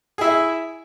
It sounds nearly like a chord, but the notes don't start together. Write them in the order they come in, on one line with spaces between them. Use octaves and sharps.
G#4 E4 E5